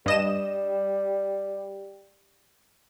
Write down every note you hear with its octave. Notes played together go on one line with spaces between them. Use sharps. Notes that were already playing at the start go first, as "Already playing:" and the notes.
G2 G3 D#5 E7